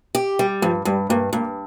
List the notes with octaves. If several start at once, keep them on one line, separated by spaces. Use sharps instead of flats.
G4
G3
G2 F3
G2 G3
G2 A#3
G2 A#3